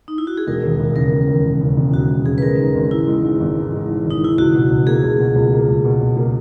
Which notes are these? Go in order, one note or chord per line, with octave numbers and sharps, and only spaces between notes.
D#4
E4
F#4
G#4
E1 A#4
D#2
E1
C#3 A#4
E1
D#2
E1
C#3
E1
D#2 F#4
E1
C#3 G#4
B4
G#3 A#4
G#2
G#1
E3 E4
G#3
G#2
G#1
E3
G#3
G#2
G#1 D#4
E3 E4
C#2 F#4
B2
C#2
A#3 G#4
C#2
B2
C#2
A#3
C#2
B2
C#2
A#3